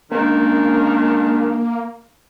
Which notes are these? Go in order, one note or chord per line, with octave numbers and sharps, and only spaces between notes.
D#3 G#3 A#3 C#4 D4